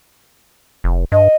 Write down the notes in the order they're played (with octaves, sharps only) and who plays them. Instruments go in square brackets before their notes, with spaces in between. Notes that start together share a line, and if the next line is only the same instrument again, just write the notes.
[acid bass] F1
[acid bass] G2 [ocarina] D#5